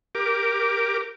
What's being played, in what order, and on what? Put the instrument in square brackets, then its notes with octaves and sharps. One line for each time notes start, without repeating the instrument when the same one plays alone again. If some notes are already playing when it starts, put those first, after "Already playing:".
[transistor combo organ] G4 A#4 D6